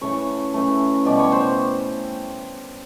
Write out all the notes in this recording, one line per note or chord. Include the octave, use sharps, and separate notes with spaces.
C#3 E3 A3 C#5
C#3 E3 A3
B2 G3 D5
C#5
C5